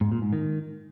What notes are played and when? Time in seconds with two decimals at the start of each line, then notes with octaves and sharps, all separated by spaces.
0.01 G#2
0.12 A#2
0.22 G#2
0.33 D#3